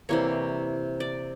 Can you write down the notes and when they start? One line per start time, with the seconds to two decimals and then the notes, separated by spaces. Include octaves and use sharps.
0.09 C3 E3 G3 A#3 C#5
1.00 D5